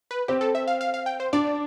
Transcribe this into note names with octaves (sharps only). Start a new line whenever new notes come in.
B4
C4 G4
A4
E5
F5
F5
F5
G5
C5
D4 D5